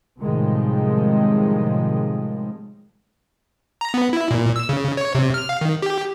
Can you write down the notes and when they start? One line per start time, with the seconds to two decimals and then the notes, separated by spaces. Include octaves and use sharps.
0.19 A2 C3 D#3 F3 G3 G#3
3.81 A#5
3.94 B3
4.13 E4
4.31 A#2
4.56 E6
4.69 C#3
4.97 C#5
5.15 C3
5.34 F6
5.49 F5
5.61 D#3
5.82 G4